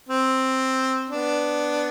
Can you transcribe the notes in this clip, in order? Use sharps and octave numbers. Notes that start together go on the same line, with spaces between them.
C4
B3 D4